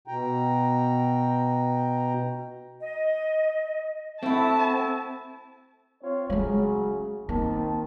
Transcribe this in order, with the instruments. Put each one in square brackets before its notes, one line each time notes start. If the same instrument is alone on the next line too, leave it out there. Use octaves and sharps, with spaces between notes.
[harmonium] B2 G5 A#5
[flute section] D#5
[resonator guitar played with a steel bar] A3 E4 [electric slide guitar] C4 [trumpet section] F#4 E5 [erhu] A5
[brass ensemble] C4 F4 C#5
[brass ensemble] C#3 F#3 [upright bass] G#3 A3
[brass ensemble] D#3 C4 A5 [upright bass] A#3